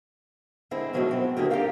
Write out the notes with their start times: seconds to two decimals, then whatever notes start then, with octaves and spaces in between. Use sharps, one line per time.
0.71 D3 G#3 C4 E4
0.93 B2 F3 F#3 G#3 A3 C4
1.09 F#3 C4 E4
1.37 D3 F#3 A#3 G4 G#4
1.50 G4 G#4 A#4 D5 F5 G5